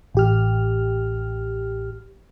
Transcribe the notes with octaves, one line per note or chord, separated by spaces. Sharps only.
A1 G4 F6